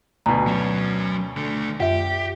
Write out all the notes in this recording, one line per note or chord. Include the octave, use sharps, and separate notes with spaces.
D2 B2 A#5
F#3 C#4
D3 A3
F#2 G4 E5